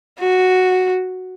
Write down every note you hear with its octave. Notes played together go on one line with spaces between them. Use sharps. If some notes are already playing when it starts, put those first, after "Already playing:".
F#4